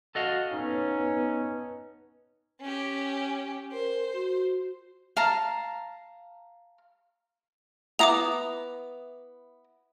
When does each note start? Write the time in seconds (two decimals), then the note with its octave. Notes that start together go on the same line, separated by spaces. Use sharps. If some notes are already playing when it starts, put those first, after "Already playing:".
0.15 F#4 A4 D#5 F5
0.51 B3 C#4 D#4
2.61 C#4 G4
3.72 A#4 C5
4.13 F#4
5.17 F5 A5 A#5
7.99 B3 E4 A#5 D6 D#6 F7